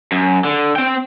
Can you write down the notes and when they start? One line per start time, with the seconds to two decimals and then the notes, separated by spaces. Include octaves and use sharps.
0.12 F#2
0.44 D3
0.76 C4 G5